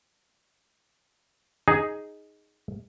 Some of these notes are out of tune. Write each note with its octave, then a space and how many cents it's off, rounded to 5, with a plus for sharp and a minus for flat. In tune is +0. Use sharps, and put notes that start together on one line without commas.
D#4 +0 G#4 +0